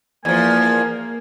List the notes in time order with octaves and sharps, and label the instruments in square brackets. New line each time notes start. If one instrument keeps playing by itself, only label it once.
[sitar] E2 F3 [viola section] A#3 [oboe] G#5